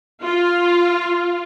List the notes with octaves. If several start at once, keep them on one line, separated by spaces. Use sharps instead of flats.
F4